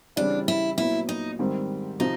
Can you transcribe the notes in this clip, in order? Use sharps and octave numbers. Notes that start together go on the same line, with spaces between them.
C#3 E3 G3 C4 D4 E4
E4
A#2 F#3 B3 E4
D#4
G#2 D#3 G3 C4
C3 F3 D#4